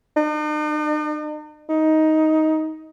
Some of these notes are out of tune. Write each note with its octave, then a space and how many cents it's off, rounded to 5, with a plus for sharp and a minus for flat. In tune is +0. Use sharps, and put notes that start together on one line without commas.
D#4 -45
D#4 +10